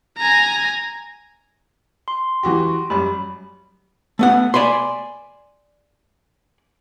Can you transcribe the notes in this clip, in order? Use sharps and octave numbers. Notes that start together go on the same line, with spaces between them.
G#5 A#5
C6
E3 F#4 G4
F#2 G3 B5
A3 B3 F#5
D5 G#5 B5 C6